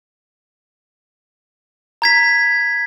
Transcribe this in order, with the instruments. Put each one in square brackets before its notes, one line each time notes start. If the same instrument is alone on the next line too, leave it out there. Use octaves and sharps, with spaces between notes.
[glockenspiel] A#5 G#6 B6